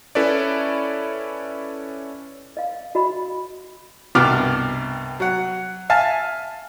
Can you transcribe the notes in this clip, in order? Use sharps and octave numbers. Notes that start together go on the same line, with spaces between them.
C#4 E4 A4 B4 C#5 D5
D#5 F5
F#4 D#5 B5
C2 G2 B2 D6 F6
F#3 F#5
E5 F5 G#5 A5